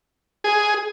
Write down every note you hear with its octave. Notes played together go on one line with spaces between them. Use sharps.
G#4